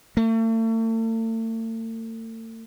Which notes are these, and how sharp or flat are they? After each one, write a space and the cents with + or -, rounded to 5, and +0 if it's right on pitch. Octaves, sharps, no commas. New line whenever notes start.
A3 +40